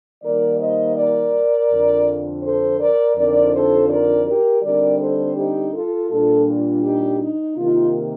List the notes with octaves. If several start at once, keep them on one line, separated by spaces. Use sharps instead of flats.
D#3 G3 A#3 D#4 A#4 D5
C5 D#5
A#4 D5
F2 D3 F3
A4 C5
A#4 D5
F2 D3 F3 C4 D#4 A#4 D5
A4 C5
A#4 D5
G4 A#4
D3 G3 C4 D#4 A#4 D5
A4 C5
D#4 G4
F4 A4
A#2 G3 D4 F4 A4
F4
D#4 G4
D#4
C3 D#3 A#3 D#4 F4